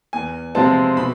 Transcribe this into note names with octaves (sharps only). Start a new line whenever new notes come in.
E2 G#5
C3 F3 G#3 C4 A5
B2 B5